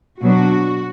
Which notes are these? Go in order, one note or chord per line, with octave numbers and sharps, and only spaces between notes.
B2 F#3 B3 D4 F#4